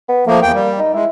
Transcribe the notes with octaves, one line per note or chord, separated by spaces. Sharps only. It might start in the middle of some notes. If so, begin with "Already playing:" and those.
B3
F3 A3 A#3
E2 A#3 G5
G3
D#4
G#3 E4